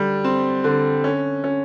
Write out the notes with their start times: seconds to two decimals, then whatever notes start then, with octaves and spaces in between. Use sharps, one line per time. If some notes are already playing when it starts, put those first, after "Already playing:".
Already playing: D3 G3
0.24 C4
0.64 D3
1.04 C#4
1.44 C#4